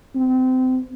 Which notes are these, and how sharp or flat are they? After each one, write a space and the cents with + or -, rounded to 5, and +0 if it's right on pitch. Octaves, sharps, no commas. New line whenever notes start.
C4 -30